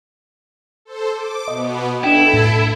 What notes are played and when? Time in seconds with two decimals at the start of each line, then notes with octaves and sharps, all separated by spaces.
0.85 A4 C5
1.15 D6
1.48 B2 B3 D#5
2.04 D4 E4 A4 G5
2.34 A2